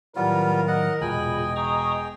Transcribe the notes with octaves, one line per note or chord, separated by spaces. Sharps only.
A2 D#3 F#3 G3 B3 F4 A#4
D#5 F#5
E1 A#2 C#3 D#5 G5 G#5 B5
G#4 G5 A#5 C#6 D#6